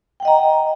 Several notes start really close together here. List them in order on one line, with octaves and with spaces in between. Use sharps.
G5 F#5 D#5 A#5